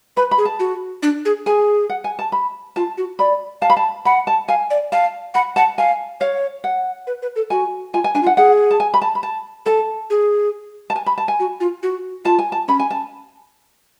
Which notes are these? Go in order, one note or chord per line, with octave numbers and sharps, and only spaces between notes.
B4 B5
B5
G#4
A5
F#4
D4
G#4
G#4 G#5
F#5
G#5
A5
B5
F4 A5
F#4
D5 B5
F5 A5
B5
A5
F#5 B5
A5
F5 G#5
D5
F5 A5
F#5 B5
F#5 A5
F5 G#5
C#5 F5
F#5
B4
B4
A4
F#4 G#5
F4 G#5
G#5
D4 G#5
F4
F#5
G#4 F#5
A5
G#5
B5
A5
B5
A5
A4 A5
G#4
A5
G#5
B5
A5
G#5
F#4
F4
F#4
F4 A5
G#5
A5
C#4 B5
G#5
A5